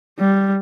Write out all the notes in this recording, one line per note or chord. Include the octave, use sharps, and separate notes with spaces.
G3